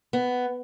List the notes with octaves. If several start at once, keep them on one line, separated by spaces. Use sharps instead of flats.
B3